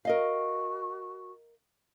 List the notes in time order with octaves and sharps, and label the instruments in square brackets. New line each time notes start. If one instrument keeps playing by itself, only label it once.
[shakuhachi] F#4 [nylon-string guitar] A#4 D#5 F5